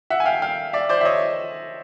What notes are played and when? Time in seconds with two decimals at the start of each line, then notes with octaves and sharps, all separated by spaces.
0.10 E5 F#5
0.20 G#5
0.25 F5 G5
0.42 F5 G5
0.73 D5 E5
0.89 C5 D5
1.01 E5
1.05 C#5 D#5